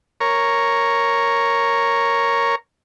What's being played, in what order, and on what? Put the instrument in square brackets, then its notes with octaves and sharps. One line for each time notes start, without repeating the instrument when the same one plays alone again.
[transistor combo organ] A#4 C#5